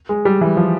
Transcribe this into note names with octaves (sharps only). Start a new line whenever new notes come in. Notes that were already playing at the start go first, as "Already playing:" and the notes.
G#3
G3
E3
F3